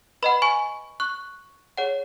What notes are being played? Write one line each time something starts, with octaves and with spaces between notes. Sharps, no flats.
B4 D#5 F#5 B5
G#5 C#6
C#6 F#6
G#4 C#5 F#5